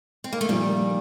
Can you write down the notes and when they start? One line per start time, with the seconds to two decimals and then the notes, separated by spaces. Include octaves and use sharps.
0.24 C4
0.33 A#3
0.41 A3
0.49 A#2 D#3 F3 G3 A#3